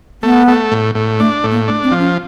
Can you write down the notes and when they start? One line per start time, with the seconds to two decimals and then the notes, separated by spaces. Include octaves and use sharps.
0.23 A3 B3
0.48 A3
0.72 A2
0.95 A2
1.19 A3 D4
1.44 A2
1.51 A#3
1.68 A3 D4
1.83 C4
1.92 F3
2.00 C#4